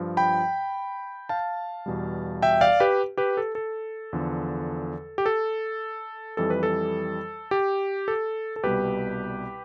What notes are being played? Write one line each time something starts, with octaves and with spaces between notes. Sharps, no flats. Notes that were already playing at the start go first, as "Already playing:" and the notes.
Already playing: G2 F3
G5 B5
F5 A5
E2 B2 G3
E5 G5
D5 F5
G4 B4
G4 B4
A4
A4
E2 D3 F3
G4
A4
F2 E3 G3 A4
B4
A4
G4
A4
A4
C2 B2 G3 G4 B4